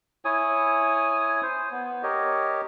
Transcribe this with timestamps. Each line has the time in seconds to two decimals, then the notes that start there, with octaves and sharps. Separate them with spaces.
0.25 E4 C#5 G#5 D#6
1.43 C5
1.72 B3
2.03 G4 A#4 C#5 D#5